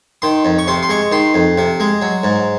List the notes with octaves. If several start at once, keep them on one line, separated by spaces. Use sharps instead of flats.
D#3 C6
F2
C#6
C3 C6
C6
G#3 C#6
D#3 C6
F2
C3
G#3
F#3
G#2